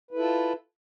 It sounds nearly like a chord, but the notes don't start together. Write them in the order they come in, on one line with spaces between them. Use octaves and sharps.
B4 E4 A4 F4